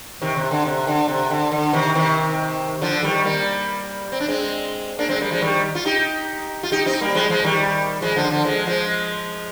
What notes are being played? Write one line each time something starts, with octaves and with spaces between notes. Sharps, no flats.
C3 D#3
C3
D3
C3
D3
C3
D3
D3
C3 D#3
C3 D#3
D3 F3
D#3 G3
G3 A#3
C4
D4
G#3 C4
A#3 D4
G#3 C4
G3 A#3
F3 G#3
D#3 G3
F4
D#4 G4
F4
D#4 G4
C4 D#4
G3 A#3
F3 G#3
F3 G#3
D#3 G3
F3 G#3
D3 F3
D3 F3
F3 G#3
F3 G#3